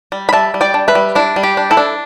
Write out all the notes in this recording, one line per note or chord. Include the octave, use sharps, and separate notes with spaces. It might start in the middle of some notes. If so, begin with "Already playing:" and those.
G3
B5
G3 E5 A5
G3
D5 G5
D4
B4 E5
G3
D4 E4
G3
G4
D4
E4 A4
D4